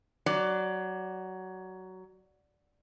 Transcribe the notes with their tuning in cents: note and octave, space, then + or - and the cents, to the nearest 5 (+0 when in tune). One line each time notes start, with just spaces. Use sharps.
F#3 +15 D5 +0